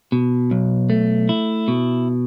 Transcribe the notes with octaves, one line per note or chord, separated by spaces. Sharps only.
B2
B1
A3
E4
B2